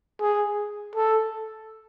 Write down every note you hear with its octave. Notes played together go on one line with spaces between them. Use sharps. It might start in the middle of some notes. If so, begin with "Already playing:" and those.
G#4
A4